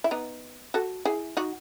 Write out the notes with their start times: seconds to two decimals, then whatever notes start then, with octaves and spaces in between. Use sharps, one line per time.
0.04 E4
0.11 B3 D#4
0.74 F#4 A4
1.05 E4 G#4
1.37 D#4 F#4